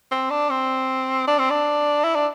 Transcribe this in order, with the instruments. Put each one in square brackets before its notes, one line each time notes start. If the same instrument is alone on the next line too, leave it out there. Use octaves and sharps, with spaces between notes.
[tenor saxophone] C4
D4
C4
D4
C4
D4
E4
D4